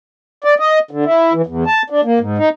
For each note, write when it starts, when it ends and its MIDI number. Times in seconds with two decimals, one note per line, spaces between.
0.44 0.54 74
0.59 0.79 75
0.91 1.05 50
1.05 1.33 64
1.33 1.42 52
1.46 1.64 40
1.66 1.82 81
1.90 2.01 62
2.05 2.19 58
2.20 2.38 44
2.38 2.49 63